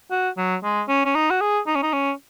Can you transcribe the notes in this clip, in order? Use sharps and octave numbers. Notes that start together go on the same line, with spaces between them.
F#4
F#3
G#3
C#4
C#4
D#4
F#4
G#4
D#4
C#4
D#4
C#4